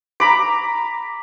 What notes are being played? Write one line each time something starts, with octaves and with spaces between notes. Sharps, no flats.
A#5 B5 D6